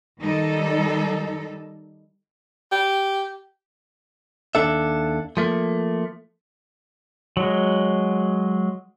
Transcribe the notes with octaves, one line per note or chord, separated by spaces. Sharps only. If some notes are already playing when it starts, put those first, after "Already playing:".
D#3 G3 D#4 A4
G4
D#2 D4 A4 E5
F3 A3 A#3
F#3 G#3